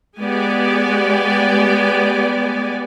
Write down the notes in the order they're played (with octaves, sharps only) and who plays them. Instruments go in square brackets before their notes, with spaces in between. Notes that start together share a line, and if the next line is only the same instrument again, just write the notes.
[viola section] G#3 B3 G4 D5 G#5